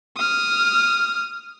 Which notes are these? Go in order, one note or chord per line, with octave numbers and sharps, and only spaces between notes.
D#6 F6